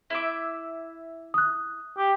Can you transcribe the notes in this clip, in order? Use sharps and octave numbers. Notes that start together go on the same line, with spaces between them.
E4 E5 D6
D#6 F#6
G4